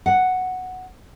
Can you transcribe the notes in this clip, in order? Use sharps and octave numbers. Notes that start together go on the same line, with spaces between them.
F#5